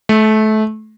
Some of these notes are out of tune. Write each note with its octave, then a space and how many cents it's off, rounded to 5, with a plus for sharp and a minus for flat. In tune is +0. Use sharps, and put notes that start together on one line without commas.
A3 -25